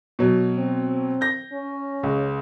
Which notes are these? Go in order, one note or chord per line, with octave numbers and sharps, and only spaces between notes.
B2 F#3
C4
G6 A#6
C#4
C#2